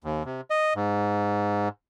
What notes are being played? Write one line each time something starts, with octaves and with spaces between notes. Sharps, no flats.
D#2
C3
D#5
G#2